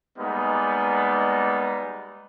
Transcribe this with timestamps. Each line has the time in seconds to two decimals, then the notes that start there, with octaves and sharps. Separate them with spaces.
0.18 G3 G#3 A#3 B3 D#4